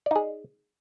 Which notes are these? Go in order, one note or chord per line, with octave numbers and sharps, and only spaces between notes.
D#4 G#4 D5